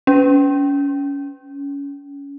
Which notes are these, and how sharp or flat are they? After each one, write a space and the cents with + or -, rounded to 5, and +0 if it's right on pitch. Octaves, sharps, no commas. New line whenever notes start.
C#4 +30